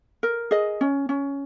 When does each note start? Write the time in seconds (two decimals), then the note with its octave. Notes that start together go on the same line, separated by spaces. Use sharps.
0.23 A#4
0.51 G#4 D#5
0.81 C#4
1.09 C#4